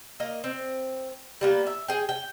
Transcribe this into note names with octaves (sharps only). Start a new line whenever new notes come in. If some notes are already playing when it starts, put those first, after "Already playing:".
A#3 D#5
C4
G3 A#3 B3
E5
G#4 G5
G5